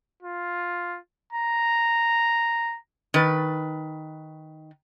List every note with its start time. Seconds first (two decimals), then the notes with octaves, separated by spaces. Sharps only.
0.23 F4
1.33 A#5
3.14 D#3 B4